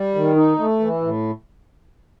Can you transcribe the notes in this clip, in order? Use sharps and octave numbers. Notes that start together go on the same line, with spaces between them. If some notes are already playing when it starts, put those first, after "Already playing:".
Already playing: G3
D#3
D#4
A3
E3
A2